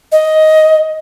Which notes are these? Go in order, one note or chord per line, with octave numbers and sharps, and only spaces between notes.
D#5